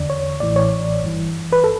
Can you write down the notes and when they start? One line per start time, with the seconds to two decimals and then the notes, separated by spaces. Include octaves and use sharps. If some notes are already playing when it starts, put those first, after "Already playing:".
Already playing: E2 D3 D5
0.10 C#5
0.40 A1 A2 E3 D5
0.56 C#5
1.02 G1 G2 E3
1.52 B4
1.64 A4